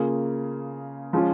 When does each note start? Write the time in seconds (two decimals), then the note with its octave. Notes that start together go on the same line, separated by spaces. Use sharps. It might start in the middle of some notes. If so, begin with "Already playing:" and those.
Already playing: C#3 A#3 F4 G#4
1.13 F3 G#3 C#4 F4